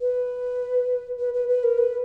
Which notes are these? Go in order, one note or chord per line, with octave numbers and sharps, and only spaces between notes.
B4
B4
B4
B4
A#4
B4